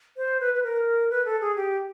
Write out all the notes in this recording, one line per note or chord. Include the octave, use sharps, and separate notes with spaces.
C5
B4
B4
A#4
B4
A4
G#4
G4